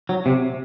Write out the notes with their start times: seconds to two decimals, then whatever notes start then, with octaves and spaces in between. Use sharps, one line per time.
0.09 F#3
0.26 C3